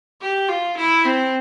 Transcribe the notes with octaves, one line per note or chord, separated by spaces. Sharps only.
G4
F4
E4
C4